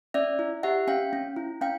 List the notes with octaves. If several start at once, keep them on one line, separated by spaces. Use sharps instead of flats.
C#4 D5 E5
E4
G4 E5 F#5
C#4 F5 G5
C#4
E4
C#4 F5 G5